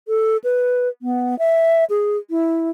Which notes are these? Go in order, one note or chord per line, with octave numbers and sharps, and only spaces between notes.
A4
B4
B3
E5
G#4
E4